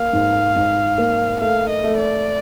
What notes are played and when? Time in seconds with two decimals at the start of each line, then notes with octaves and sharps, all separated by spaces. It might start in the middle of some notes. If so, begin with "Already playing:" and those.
Already playing: A#3 F5
0.13 G#2
0.56 G#2
0.98 A#3
1.41 A3 F5
1.70 D#5
1.84 A3
1.98 D5